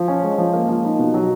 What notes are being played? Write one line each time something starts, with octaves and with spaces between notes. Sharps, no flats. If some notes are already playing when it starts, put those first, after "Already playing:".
Already playing: F3
C#4
G#3
F3
A#3
F3
D#4
B2
F#3